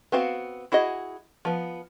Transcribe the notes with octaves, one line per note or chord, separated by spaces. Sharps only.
B3 C4 F#4 F5
E4 F#4 G#4 D#5
F3 B3